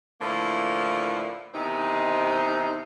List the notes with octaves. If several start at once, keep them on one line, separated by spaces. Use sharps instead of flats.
A2 D3 E3 F3 A#3
E2 C3 D#3 C4 D#4